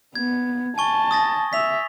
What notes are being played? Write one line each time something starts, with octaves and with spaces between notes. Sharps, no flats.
B3 G#6
G#5 A5 C#6 G7
D#6 A6 A#6
E5 B6 F7